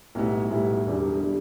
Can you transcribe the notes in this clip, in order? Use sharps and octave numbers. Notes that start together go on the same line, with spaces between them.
B1 A2 G3 B3 E4
B1 A2 G3 B3 E4
E1 E2 D3 G3
D3 G3